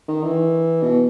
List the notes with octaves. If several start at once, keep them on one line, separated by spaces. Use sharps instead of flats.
D#3
E3
B2